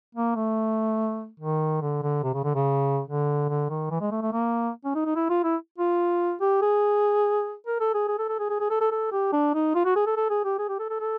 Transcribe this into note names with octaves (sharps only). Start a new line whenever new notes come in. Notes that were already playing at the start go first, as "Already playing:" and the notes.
A#3
A3
D#3
D3
D3
C3
C#3
D3
C#3
D3
D3
D#3
E3
G#3
A3
A3
A#3
C#4
D#4
D#4
E4
F4
E4
F4
G4
G#4
A#4
A4
G#4
G#4
A4
A4
G#4
G#4
G#4
A4
A4
A4
G4
D4
D#4
F4
F#4
G#4
A4
A4
G#4
G4
G#4
G4
A4
A4
A4